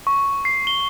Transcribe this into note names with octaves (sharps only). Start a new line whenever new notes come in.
C#6
C7
G7